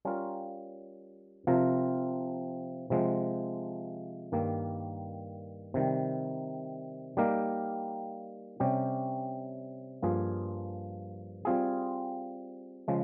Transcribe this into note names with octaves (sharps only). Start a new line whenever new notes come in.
G3 C#4 F4 A#4
C3 F3 C4 F4 A#4
C3 F3 G#3
G2 D#3 G3 A#3
C3 D#3 G3
G3 A#3 D#4 G4 A#4
C3 G3 C#4 G4
G2 F3 A#3 F4 G#4
G3 C4 F4 G#4
C#3 F3 G#3